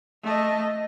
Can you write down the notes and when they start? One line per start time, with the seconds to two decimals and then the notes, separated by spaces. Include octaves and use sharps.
0.23 A3 D#5